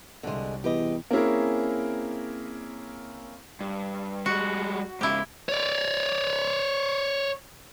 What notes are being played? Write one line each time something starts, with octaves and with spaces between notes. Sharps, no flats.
C2 D3 G#3
E2 G4 B4 D#5
A#3 C4 C#4 E4 G#4 A#4
G2
G3 G#3 F#4
G#2 C#3 E4 G4
C#5 D5